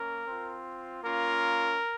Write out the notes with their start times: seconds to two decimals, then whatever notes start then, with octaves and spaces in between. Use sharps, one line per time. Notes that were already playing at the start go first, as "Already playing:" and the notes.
Already playing: A#3 C#4 A#4
0.26 C4 F4
1.03 A#3 C#4 F4 A#4